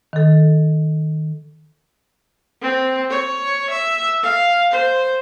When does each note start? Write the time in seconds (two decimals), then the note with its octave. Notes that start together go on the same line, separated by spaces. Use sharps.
0.13 D#3 A4
2.62 C4
3.11 C#5
3.71 E5
4.23 F5
4.71 C5